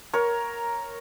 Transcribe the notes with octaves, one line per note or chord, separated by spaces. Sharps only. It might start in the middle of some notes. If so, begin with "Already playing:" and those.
A#4 C#5